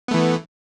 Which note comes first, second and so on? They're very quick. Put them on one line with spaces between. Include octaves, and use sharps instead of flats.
B3 A3 E3